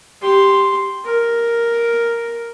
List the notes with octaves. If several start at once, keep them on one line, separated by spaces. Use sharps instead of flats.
G4 C6
A#4